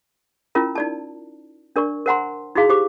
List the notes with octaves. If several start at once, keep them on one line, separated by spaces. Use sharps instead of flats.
C#4 E4 F4 A#4 A#5
D#4 D5 A5
D4 A#4 D5 C#6
A#4 C5 F#5 G#5 A#5 C6
D#4 E4 F#4 G#4 F5
G4 C5 C#6 D6